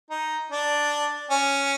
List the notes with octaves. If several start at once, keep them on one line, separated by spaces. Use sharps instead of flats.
D#4
D4
C#4